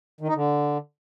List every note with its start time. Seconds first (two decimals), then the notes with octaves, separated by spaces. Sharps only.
0.21 D#3
0.28 D#4
0.35 D3